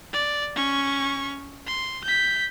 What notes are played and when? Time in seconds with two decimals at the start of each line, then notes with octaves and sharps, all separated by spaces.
0.13 D5
0.55 C#4 C#6
1.67 C6
2.04 G6 B6